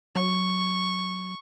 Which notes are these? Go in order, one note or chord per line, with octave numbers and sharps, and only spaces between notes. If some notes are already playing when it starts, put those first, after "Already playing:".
F#3 C#6